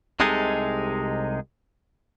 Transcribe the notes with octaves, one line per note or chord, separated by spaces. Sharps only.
C2 C3 G#3 D#4 G#4 A4